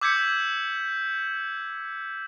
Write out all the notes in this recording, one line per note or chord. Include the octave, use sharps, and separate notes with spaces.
D6 E6 G6 G#6 B6 C#7